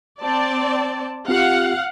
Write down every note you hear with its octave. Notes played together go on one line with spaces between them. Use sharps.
C4 D5 A5
C4 F4 G4 F5 F#5